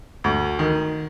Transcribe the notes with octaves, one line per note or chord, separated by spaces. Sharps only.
D2
D#3